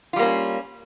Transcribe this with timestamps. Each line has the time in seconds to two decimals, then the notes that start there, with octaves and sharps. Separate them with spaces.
0.13 F4
0.16 G3
0.19 A#3
0.22 C4
0.25 C#4